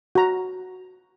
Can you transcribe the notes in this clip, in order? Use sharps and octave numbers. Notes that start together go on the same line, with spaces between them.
F#4 A#5